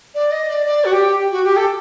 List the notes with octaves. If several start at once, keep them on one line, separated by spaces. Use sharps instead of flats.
D5
D#5
D5
D5
F#4
G4
F#4
G4
A4